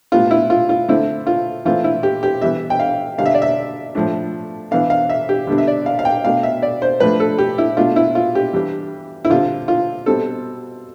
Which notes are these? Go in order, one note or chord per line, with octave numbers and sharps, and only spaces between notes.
A2 G3 B3 F4
E4
F4
F4
D3 A3 C4 E4
F4
E3 A3 C4 F4
E4
G4
G4
E3 G3 B3 E5
G5
F5
D3 G3 D4 F5
E5
D5
E5
A2 F3 A3 D4
E3 B3 D4 F5
F5
E5
G4
D3 G3 B3 D4
E5
D5
F5
F5
G5
B2 A3 D4 F5
E5
D5
C5
A2 F3 A3 D4 B4
A4
G4
E4
B2 A3 D4 F4
E4
F4
G4
E3 G3 D4
E4
D3 G3 C4 F4
F4
B2 G3 C4 A4